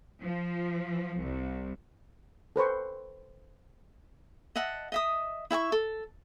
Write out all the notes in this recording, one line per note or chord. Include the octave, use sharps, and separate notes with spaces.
F3
C2
A4 B4 C5 C#6
D#5 E5 F#5 A5
D#5 E5 D#6
E4 E5 G#5 C#6
A4